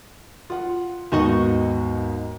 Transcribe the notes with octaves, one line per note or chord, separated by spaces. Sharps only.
F4 F#5
D#2 G#2 B3 D#4 F#4 D#5